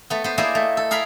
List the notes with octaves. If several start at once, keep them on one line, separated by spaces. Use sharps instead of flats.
A3 B3
B3 C5
A#3 E4 G#4 C5 D5 D#5
A3
A4
G#4 A#4 F5 B5